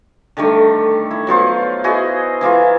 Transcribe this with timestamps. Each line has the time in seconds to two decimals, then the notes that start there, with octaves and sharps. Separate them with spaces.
0.37 D3 D#3 G3 A3
1.11 E4
1.27 F#3 B3 F4 C5
1.84 E4 F#4 G#4 D#5
2.41 E3 A#3 E4 F4